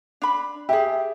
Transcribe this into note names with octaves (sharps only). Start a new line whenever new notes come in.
D4 B5
G4 G#4 E5